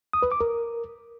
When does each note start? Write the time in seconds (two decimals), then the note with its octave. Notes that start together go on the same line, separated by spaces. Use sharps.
0.13 D#6
0.22 B4
0.32 D6
0.41 A#4